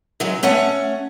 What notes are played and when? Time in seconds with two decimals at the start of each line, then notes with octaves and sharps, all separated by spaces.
0.20 C#3 F#3 G#3
0.43 A3 C#4 C#5 F#5